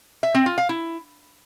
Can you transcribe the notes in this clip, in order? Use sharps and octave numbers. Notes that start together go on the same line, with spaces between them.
E5
C4
F4
F5
E4